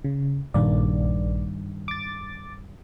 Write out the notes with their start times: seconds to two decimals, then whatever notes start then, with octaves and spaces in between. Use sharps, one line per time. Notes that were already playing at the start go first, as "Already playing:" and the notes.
0.04 C#3
0.54 A#1 G2 D#3 A#3 D5
1.88 D6 A6